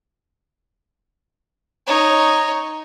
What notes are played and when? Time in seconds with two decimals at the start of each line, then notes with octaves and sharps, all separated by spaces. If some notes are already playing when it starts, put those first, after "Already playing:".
1.87 D#4 C#5